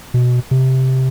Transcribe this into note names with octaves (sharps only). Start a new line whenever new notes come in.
B2
C3